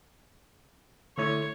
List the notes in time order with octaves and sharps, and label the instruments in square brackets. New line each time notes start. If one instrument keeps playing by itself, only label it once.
[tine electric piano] D3 A3 E4 [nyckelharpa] C#5